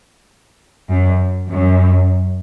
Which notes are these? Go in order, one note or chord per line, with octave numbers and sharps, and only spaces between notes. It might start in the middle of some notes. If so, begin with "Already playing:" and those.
F#2
F#2